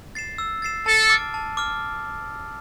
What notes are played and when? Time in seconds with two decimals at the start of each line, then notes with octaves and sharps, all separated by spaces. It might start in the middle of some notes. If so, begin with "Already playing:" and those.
0.15 A6 C7 E7
0.38 E6
0.62 A6 C7 E7
0.86 A4 A5
1.10 D6 F6 A6 D7
1.34 A5
1.57 D6 F6